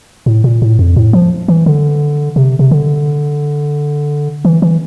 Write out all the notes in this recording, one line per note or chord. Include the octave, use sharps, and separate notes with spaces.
A2
A#2
A2
F2
A2
F3
E3
D3
C3
C3
D3
E3
E3